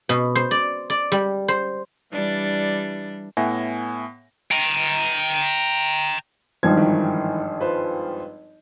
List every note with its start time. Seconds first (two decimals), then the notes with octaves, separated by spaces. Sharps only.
0.09 B2
0.35 C5
0.51 D5
0.90 D5
1.12 G3
1.48 C5
2.12 E3 G3 D4
3.37 A2 B3 E5 F#5 G#5 A#6
4.51 G5 A#5
6.63 G#1 G2 F3 G#6
6.77 D#3 E3
7.60 F4 B4 C5